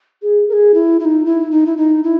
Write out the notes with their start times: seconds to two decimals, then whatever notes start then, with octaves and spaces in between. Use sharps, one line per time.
0.22 G#4
0.49 A#4
0.53 G#4
0.74 E4
1.00 E4
1.05 D#4
1.26 E4
1.51 D#4
1.66 E4
1.77 D#4
2.04 E4